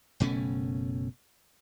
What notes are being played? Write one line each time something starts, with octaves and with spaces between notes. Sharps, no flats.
F#1 B2 A3 C#4